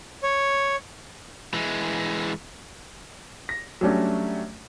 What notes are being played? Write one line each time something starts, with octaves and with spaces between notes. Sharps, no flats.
C#5
E3 G#3
A#6
F#3 G3 A3 C#4 D4